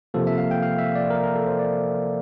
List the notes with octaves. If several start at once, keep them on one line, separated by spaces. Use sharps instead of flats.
C3 F3 A#3 A4
E5
F5
G5
F5
E5
D5
A#4
A#4
A4
C5
D5